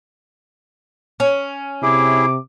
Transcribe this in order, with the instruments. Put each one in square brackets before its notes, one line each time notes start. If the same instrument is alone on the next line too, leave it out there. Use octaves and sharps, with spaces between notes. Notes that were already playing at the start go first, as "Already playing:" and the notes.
[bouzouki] C#4
[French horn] C3 [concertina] E4 G#4 [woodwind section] D6